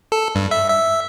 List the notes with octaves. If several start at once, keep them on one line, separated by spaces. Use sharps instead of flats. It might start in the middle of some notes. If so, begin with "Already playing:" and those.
A4
G2
E5
E5